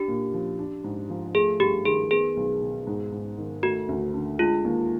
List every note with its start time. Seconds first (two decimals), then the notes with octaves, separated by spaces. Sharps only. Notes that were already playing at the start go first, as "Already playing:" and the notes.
Already playing: D4 G4
0.08 A#2
0.34 F3
0.59 D4
0.84 G#2
1.10 F3
1.35 A3 G#4
1.60 G2 G4
1.85 D#3 G#4
2.11 B3 G#4
2.37 B1
2.62 B2
2.87 G#2
3.12 G#2
3.38 D#3
3.63 A3 F#4
3.89 D2
4.14 D3
4.39 G#3 F4
4.65 D#2